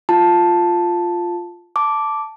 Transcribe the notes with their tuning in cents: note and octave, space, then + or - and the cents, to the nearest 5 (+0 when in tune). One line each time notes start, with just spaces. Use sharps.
F4 +0 A5 +0
A5 +0 D6 -5